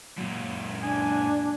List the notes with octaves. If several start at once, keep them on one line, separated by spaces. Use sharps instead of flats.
F#2 A#2
D4 G#5